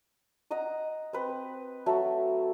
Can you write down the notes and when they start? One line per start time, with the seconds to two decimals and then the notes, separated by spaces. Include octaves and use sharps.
0.51 D#5 F#5 A#5 D#6
1.13 C4 B4
1.86 F#3 A3 A4